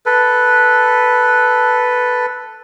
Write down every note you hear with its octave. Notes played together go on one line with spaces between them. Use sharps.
A4 B4